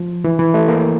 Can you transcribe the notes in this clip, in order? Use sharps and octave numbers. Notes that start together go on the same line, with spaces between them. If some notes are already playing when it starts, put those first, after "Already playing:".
Already playing: F3
E3
E3
A3
A#3